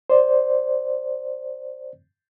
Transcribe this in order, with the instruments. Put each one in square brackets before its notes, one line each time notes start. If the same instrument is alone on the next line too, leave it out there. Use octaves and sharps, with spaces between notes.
[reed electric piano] C5 D5